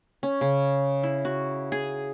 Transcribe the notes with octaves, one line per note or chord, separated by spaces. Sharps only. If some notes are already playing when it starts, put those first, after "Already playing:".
C#4
C#3
E4
F#4
G#4